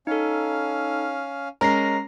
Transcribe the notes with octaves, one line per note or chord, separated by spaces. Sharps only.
C#4 D#4 A4 F5
G#3 C#4 A#4 A#5 A#6 C7